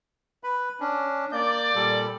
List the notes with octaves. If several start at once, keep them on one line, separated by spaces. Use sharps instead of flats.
B4 B5
C#4 D4
A#3 D5 G6
A#2 G3 A4